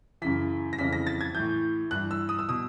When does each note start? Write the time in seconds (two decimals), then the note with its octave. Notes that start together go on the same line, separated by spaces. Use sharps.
0.22 F#2 C#3 E3 B6
0.73 A#6
0.79 F2 C#3 E3 B6
0.93 A#6
1.07 A6
1.21 G#6
1.35 A2 E3 G6
1.91 G2 E3 F#6
2.11 E6
2.29 D#6
2.39 E6
2.49 B2 D#6